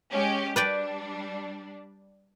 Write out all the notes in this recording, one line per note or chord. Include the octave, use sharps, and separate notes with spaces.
G#3 C#4 G4
G3 D4 B4 D5 G5